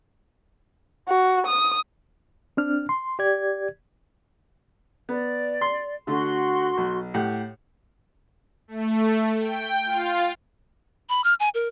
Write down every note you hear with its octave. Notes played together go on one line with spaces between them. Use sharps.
F#4
D#6
C4 D4 F6
C6
G4 D5 G#6
B3 D5
C6
D3 A3 F#4 C6
B1
A2 G4 F#5
A3
G5
F4
B5
F6
G#5
A#4